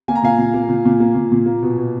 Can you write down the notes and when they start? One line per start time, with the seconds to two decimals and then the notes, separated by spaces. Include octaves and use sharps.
0.08 A#3 G#5
0.15 A#5
0.23 A#2 F5 G#5
0.38 A#2
0.54 A#3
0.69 A#2
0.85 A#2
1.00 A#3
1.15 A#2
1.32 A#2
1.46 A#3
1.63 B2
1.78 B2